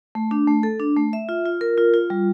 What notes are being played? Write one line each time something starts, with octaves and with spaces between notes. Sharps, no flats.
A3
D4
A3
A4
D4
A3
E5
F4
F4
A#4
F4
F4
G3